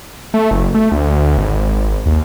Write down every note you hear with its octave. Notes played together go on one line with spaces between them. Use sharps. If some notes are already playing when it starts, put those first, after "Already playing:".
A3
F#1
A3
D2
G#1
D#2